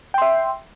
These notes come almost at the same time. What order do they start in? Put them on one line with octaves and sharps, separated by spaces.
G5 C6 E5